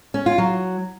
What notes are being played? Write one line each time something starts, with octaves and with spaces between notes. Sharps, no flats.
C#4
F4
F#3